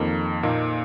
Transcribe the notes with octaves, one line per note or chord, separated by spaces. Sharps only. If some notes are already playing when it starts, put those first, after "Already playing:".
Already playing: F2 D#3 A#3
A#2 A#3 D#4